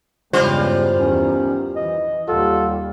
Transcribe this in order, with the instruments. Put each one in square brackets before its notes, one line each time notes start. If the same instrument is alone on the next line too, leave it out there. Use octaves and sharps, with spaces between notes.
[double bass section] E2 G2 C#3 [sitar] G3 F4 C5 [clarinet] G#3
[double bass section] E2 D#3 [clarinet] C#4
[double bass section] E3 [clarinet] D#5
[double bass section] D#2 G3 [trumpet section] F4 A4 [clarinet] F#5